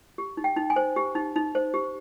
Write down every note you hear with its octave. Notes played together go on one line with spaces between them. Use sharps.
G4
D#4
G5
D#4
G#5
C5
G4
D#4
D#4
C5
G4